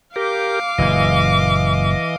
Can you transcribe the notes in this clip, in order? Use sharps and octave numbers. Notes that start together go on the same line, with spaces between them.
G4 A#4 F5 D6
F#1 A#2 E3 D#5